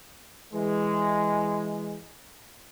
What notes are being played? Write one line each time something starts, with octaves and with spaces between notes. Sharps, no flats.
E3 G#3